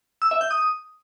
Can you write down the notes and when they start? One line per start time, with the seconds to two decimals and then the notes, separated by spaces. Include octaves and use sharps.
0.22 E6
0.31 E5
0.41 G6
0.51 D#6